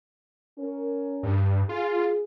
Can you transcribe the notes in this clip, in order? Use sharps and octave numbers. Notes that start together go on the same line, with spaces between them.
C#4 A#4
G2
F4 G#4